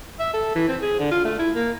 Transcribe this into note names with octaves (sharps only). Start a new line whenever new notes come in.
E5
A4
E3
C4
G#4
D3
F4
A3
E4
A#3